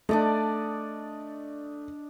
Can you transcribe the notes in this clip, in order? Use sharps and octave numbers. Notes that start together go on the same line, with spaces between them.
A3 D4 D5 D#5